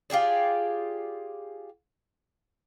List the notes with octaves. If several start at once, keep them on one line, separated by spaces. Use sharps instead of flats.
F4 G4 G#4 D5